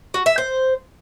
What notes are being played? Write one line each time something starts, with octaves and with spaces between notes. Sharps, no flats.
F#4
E5
C5